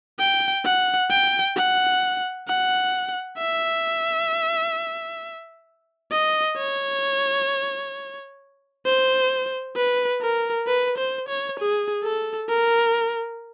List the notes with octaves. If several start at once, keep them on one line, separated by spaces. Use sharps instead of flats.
G5
F#5
G5
F#5
F#5
E5
D#5
C#5
C5
B4
A#4
B4
C5
C#5
G#4
A4
A#4